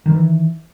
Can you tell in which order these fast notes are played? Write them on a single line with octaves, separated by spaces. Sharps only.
D#3 F#3 E3